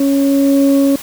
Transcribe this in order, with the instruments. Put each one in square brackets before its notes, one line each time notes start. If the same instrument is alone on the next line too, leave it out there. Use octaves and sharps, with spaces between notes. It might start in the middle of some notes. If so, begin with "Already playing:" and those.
Already playing: [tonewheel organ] C#4